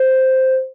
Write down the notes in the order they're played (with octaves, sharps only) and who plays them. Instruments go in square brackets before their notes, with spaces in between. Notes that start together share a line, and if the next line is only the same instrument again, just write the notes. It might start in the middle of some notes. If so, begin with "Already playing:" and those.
Already playing: [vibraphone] C5